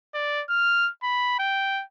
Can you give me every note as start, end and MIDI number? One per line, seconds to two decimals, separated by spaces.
0.15 0.43 74
0.50 0.90 89
1.03 1.36 83
1.39 1.83 79